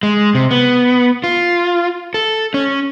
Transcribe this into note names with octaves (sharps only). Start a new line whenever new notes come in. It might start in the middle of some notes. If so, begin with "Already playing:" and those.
G#3
C3
B3
F4
A4
C#4